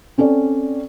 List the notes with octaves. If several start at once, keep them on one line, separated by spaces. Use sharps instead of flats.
C4 C#4 A4 D5